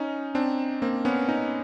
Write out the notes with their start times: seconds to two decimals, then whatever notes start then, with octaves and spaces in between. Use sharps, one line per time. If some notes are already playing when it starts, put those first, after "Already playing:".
Already playing: C#4 D#4
0.35 C4 D4
0.82 A#3 C4
1.05 B3 C#4
1.29 C#4 D#4